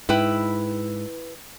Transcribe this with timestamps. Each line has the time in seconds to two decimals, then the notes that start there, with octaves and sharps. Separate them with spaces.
0.09 G#2 E4 B4 G5